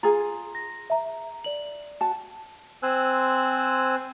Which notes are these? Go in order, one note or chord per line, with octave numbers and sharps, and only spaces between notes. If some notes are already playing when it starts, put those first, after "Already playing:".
F4 G#4 A#5
A#6
E5 A#5
D5 F#7
F#4 A5
C4 C5 G#5 E6 F#6